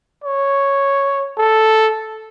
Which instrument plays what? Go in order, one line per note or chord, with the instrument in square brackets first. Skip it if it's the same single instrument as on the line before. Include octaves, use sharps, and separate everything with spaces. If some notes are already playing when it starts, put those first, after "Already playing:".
[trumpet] C#5
A4